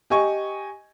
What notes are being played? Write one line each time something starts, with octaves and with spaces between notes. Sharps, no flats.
G4 D#5 G#5 C#6